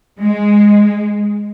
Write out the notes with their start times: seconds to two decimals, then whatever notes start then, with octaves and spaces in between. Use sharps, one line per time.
0.19 G#3